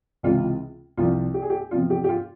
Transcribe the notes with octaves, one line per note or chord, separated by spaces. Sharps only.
C#2 C3 E3 F4
C2 C3 F3 F4
G4
G#4
G4
E2 C3 F3 F4
G4
G4
F4